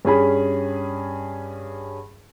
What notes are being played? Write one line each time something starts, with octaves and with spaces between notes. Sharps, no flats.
G2 C#4 G#4 B5